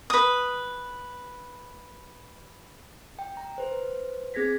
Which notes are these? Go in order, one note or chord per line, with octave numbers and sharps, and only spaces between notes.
B4 D#6
G5
A#5
B4 C5
C4 G#4 G#6 A#6 B6